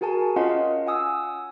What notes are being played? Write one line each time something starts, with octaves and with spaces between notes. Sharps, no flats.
F#4 G#4 A#4 G#5 A5
C#4 F4 D#5 F5 F#5 C6
F#5 G#5 D#6 E6